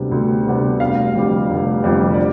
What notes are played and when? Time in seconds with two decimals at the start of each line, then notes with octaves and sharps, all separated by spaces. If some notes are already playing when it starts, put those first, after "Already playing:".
Already playing: D2 C3 G3 B3 D4
0.11 D2
0.45 C3 G3 B3 D4
0.80 F1 F5
1.15 F2 D3 G3
1.49 F1
1.84 F2 D3 G3
2.14 D5